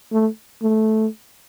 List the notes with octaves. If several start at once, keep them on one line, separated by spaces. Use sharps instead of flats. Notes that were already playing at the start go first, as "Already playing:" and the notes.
A3
A3